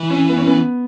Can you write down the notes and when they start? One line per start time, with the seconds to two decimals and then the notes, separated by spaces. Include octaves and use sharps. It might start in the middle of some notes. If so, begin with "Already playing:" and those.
Already playing: E3
0.10 C#4
0.29 B3
0.38 C#4
0.47 B3